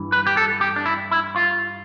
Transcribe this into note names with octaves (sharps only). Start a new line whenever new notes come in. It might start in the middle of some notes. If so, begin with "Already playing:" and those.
Already playing: G2 E3
B4
G4
A4
G4
D4
E4
E4
F4